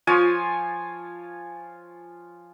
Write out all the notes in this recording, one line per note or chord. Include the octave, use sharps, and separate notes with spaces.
F3 F4 C#5 G#5